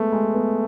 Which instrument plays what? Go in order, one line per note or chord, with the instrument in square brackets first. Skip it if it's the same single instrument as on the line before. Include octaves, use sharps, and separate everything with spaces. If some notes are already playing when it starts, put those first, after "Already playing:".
Already playing: [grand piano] G#3 B3 [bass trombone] A3
[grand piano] G#3
B3